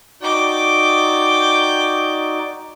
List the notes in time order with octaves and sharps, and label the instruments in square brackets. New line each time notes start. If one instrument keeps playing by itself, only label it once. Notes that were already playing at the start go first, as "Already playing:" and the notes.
[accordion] D#4 F#4 D5 [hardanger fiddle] G5 D6